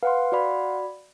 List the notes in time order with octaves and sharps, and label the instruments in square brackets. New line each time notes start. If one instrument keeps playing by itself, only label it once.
[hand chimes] B4 [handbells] F5 F#5 C6
[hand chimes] F#4 D5 B5